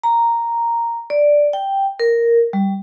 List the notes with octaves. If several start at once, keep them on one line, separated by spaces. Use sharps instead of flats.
A#5
D5
G5
A#4
G3